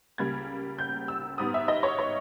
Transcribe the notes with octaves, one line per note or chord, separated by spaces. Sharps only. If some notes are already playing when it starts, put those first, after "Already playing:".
C#2 C#3 G3 A#3 G#6
G6
E6
G#2 G3 B3 D#6
E5
D#5
C#5
C#5